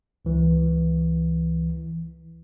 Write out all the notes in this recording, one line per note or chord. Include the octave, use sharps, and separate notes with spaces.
C#2 E3